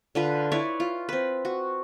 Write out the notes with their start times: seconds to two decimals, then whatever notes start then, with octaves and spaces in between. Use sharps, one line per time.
0.15 D3 F4 B4
0.52 E4 B4 C#5 D5
0.80 F4
1.09 C4 B4
1.45 F#4